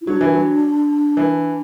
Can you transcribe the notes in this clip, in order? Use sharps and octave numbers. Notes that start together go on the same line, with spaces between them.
E4
F#3 D4
E3
F#3
E3